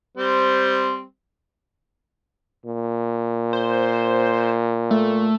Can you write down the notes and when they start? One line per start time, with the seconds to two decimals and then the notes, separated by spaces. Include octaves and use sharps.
0.17 G3 C4 C5
2.66 A#2
3.53 C5
4.91 A3